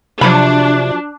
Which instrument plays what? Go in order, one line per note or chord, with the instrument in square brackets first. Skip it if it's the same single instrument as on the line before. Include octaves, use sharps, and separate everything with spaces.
[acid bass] C3 [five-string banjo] F3 F#3 B5 [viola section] D4